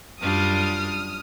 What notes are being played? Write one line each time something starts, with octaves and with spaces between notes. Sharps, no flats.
F#2 G3 D4 F4 D#6 F6